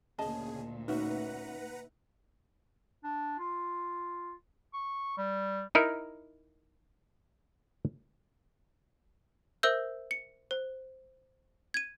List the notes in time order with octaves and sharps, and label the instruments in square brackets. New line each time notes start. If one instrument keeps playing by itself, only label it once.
[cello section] D2 A#2 [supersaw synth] C#3 G#4 [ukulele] D#5 A5
[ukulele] C#4 F#4 [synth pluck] D#4 E5 [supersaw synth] B4 F#5 A#5
[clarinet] D4
F4
C#6
G3
[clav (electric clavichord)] D#4 E4 A#4
[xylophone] A#4 C5 E5 E6 G6
C#7
C5
G#6 D#7